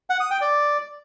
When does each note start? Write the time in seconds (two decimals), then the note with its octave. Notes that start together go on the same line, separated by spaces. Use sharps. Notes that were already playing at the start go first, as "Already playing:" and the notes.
0.10 F#5
0.20 D#6
0.31 G5
0.41 D5